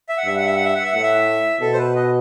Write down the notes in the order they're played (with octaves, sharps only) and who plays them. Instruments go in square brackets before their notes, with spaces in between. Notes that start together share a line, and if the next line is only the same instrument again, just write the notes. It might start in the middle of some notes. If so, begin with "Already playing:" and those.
[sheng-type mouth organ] E5
F#5
[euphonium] G2 [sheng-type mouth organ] E5
[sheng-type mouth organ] F#5
E5
F#5
E5
F#5
E5
[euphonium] A2 [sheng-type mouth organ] F#5
[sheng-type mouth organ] E5
[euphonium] B2 [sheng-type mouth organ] A4
[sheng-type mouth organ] C5
B4
D#5